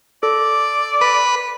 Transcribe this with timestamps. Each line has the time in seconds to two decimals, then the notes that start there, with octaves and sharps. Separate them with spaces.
0.23 A4 D5
1.01 B4